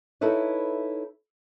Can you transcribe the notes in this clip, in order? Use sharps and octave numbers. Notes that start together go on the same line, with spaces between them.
D#4 E4 A4 B4 C#5